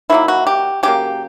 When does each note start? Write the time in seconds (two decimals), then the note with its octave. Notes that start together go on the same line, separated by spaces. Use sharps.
0.10 D#3 F#3 A#3 E4
0.28 F#4
0.47 G4
0.83 C#3 F#3 A#3 G4